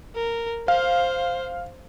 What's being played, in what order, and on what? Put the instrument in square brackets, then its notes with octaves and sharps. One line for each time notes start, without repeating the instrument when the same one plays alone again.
[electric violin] A#4
[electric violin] C5 [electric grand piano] F5